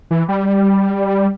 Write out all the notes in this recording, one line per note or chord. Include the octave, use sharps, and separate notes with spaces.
E3
G3